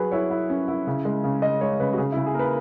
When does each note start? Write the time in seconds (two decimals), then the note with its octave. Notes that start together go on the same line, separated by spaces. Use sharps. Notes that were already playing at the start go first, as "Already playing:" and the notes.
Already playing: F#3 G#4 B4
0.11 E4 C#5
0.30 E4
0.50 C#4
0.68 E4
0.87 C#3
1.05 G#3
1.24 C#3
1.42 G#3 D#5
1.61 G#3 C#5
1.80 C#3 B4
1.93 F#4
1.98 C#3 G#4
2.12 E4
2.17 C#3
2.26 G#4
2.34 A#3 A#4 B4